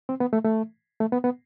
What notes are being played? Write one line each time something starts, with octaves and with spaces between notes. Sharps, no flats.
C4
B3
A3
A3
A3
B3
B3